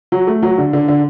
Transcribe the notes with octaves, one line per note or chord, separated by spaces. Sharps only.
F#3
A3
F#3
D3
D3
D3